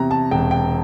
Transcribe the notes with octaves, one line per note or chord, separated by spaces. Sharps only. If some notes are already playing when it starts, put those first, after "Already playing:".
Already playing: E2 C3 E3 A#5
A5
E1 G5
G5